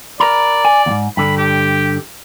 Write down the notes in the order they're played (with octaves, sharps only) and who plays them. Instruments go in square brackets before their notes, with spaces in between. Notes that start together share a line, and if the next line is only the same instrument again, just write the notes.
[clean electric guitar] A#4 A#5 B5 [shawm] D5
[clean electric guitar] G#5
D#2 G#2
[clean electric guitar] G2 D3 [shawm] B5
[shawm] G4